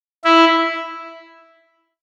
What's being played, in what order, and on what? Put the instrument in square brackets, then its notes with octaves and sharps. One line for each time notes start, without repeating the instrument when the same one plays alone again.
[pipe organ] E4